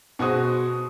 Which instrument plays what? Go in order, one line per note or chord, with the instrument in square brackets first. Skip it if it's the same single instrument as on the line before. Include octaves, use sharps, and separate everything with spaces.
[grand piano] B2 F#4 G#4 C5 D#6